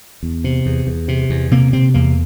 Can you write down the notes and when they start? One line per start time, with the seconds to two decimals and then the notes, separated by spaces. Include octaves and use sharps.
0.23 E2
0.44 C3
0.66 E2
0.87 E2
1.08 C3
1.30 E2
1.51 C3 A#3
1.73 C3 C4
1.94 E2 A#3